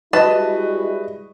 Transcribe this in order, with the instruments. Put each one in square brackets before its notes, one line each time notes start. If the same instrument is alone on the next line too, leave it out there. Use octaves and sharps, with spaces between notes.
[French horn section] G3 G#3 E4 [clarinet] F#4 [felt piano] B4 D#5 [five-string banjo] A5